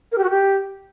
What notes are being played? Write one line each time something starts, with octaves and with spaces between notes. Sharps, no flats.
A#4
G4
F#4
G4